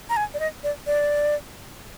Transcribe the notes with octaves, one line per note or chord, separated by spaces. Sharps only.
A#5
G#5
D5
D#5
D5
D5